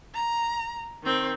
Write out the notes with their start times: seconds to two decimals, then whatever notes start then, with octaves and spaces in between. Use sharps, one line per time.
0.15 A#5
1.03 D#3 C4